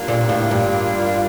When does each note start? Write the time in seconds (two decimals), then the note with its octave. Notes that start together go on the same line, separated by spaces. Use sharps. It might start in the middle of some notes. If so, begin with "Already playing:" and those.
Already playing: G3 A#3 D4 F4
0.08 A#2
0.29 A2
0.51 G2